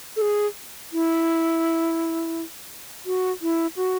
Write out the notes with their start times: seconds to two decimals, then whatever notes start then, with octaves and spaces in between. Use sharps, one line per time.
0.17 A4
0.22 G#4
0.93 E4
3.06 F#4
3.42 E4
3.76 F#4